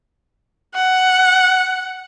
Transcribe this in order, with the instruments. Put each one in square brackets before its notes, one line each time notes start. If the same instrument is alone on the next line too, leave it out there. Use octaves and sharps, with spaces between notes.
[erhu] F#5